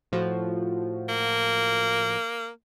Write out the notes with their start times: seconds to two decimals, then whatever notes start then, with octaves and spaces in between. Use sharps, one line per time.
0.12 A2 F3 F#4
1.09 A#3